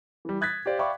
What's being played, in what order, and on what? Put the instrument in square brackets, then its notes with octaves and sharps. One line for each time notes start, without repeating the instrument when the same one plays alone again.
[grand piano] E3 G3
D#6 F#6 G#6 A6 B6
G4 C5 D5 F5
D5 E5 F5 G5 B5 C#6